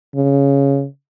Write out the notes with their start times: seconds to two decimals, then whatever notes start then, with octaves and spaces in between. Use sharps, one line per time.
0.15 C#3